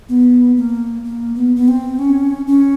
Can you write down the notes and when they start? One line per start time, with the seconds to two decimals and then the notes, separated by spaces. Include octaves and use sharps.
0.09 B3
0.57 A#3
1.04 A#3
1.35 B3
1.56 B3
1.68 C4
1.99 C#4
2.47 C#4